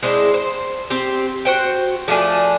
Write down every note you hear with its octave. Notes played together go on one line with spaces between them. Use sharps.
G#3 C4 D4 E4
C5
C4 G4
F#4 C5 G5
F3 A3 D4 G#5